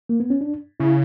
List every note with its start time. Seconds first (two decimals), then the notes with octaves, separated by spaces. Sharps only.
0.09 A#3
0.20 B3
0.30 C#4
0.41 D4
0.80 C#3 E4